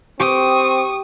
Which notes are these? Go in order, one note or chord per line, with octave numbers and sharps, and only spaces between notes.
C4 G4 C#6 D#6